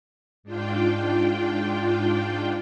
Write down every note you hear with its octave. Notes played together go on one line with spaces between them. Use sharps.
G#2 D4 F4 G5